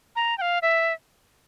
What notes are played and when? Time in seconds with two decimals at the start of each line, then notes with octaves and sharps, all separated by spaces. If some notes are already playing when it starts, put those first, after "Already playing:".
0.16 A#5
0.38 G5
0.41 F5
0.62 E5